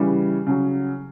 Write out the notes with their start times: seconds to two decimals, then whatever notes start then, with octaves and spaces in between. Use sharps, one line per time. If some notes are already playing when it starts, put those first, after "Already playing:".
Already playing: C#3 E3 G3
0.47 C#3 F#3